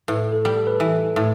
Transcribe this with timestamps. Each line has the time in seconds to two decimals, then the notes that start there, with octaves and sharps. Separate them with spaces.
0.08 A2 B4
0.32 A4
0.45 G3
0.56 A4
0.67 B4
0.76 E3 A4
1.16 A2